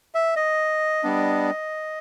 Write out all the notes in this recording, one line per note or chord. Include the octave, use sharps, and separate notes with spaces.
E5
D#5
G3 B3 D4